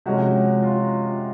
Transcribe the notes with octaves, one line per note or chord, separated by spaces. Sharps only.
C3 F3 G#3 C#4 F#4
F4